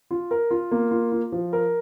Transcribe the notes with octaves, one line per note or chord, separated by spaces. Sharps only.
F4
A#4
F4
A#3
F4
F4
F3
A#4